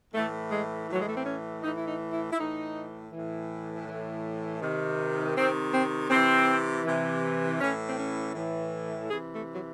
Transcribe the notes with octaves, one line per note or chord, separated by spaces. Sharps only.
A2 E3 A3
G#3
A2 E3 F#3
G#3
A3
C4
C#4
A2 E3 D#4
E4
D#4
E4
E4
A2 E3 D#4
A2 E3
A2 E3
C3 D#3
C3 D#3 C4
C4
C3 E3 C4
C3 E3
A2 E3 C#4
C4
C#4
A2 E3
C3 E3 G#4
A3
F#3